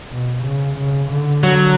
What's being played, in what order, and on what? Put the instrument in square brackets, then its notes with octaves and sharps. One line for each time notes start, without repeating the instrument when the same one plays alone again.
[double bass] B2
C#3
C#3
D3
[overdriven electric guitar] F#3